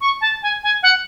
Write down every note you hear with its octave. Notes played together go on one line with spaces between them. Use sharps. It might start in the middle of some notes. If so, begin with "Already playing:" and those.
C#6
A5
G#5
G#5
F#5